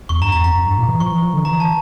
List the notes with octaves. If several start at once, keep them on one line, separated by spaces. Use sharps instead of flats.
E2 C#6
G2 A#5
E2 A#5
F2 A#5
F2
G2
A#2
E3
F3 C#6
E3
F3
D3
E3 A#5
A5